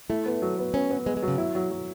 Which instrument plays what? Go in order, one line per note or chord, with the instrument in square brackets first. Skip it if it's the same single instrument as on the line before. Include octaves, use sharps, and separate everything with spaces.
[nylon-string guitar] A3 [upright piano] E4
[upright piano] B3
F#3
B3
[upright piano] B3 [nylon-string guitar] C#4
[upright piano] B3
[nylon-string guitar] G#3 [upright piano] B3
[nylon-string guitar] G#3
[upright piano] F#3
[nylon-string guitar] C#3
[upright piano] E4
F#3
F#3